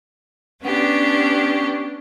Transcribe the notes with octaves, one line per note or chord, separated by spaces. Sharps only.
B3 C#4 D4 G4